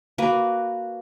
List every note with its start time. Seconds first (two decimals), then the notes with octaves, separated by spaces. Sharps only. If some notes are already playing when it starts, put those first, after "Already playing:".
0.18 A#3 F#4 B4